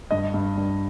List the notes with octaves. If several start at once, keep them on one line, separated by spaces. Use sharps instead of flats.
G2 D#5
G2
G2